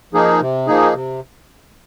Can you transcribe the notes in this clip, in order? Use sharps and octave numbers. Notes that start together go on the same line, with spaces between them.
F3 A#3 D#4 G#4
C3
F3 A#3 D#4 G#4
C3